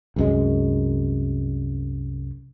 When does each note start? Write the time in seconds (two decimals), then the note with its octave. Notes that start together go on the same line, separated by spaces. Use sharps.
0.16 C2 F#2 G#3